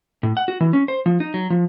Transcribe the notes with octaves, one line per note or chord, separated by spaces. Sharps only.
A2
F#5
F#4
E3
C#4
C5
F3
D#4
F#3
F3